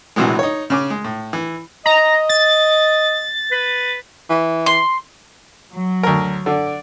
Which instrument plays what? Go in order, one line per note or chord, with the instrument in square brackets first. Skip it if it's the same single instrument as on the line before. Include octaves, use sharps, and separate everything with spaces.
[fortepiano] A#1 C3 E3 F#3 G#3
D#4 C#5
C#3 C#4 D6
G#3
A2
E3
[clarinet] D#5 [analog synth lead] A#5
[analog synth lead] A6
[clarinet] B4
[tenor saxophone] E3
[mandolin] C6
[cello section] F#3
[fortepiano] D2 A#4
[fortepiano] D3 [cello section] D5